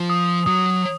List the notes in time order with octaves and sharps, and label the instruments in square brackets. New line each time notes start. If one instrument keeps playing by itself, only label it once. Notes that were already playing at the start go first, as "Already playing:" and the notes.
Already playing: [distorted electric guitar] F3
[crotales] D#6
[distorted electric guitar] F#3 [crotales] D#6